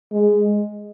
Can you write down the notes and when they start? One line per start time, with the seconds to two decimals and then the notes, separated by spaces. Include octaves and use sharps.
0.12 G#3